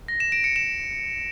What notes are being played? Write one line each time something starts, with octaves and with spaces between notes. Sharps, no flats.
A#6
E7
D7
C#7
E7